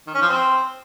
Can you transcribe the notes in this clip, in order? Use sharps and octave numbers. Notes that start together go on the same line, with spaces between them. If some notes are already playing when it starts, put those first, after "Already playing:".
D#3
C#4
F3
C4